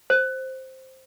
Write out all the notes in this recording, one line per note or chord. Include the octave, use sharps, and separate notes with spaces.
C5